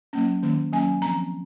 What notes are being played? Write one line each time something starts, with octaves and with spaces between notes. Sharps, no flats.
F#3 A#3 C#4
D#3 A#3 C#4
F#3 A#3 C#4 G#5
F3 C4 A#5